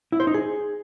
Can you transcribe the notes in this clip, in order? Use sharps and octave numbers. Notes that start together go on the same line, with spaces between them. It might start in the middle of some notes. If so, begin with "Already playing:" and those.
E4
C5
D#4
G#4